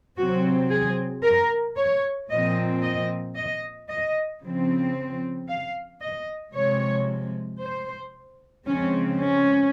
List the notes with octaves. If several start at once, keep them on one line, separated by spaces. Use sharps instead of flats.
C3 F#3 C4 F#4
G#4
A#4
C#5
A#2 F3 C4 D#5
D#5
D#5
D#5
C#3 F3 C4
F5
D#5
C3 F3 G#3 C#5
C5
C#3 F3 G#3 C4 C#4
C#4